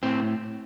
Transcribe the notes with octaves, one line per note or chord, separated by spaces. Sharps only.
A2 C4